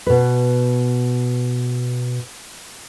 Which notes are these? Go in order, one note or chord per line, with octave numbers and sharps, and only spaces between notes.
B2 B4